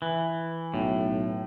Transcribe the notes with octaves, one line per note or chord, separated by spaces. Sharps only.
E3
B1 A2